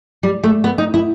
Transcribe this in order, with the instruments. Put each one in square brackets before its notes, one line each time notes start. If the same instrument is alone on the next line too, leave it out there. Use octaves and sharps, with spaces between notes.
[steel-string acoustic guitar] G3
A3
B3
D#4
E4